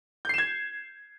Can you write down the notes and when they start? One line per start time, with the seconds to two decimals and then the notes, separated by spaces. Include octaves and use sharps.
0.25 G6
0.29 C7
0.34 E7
0.38 G#6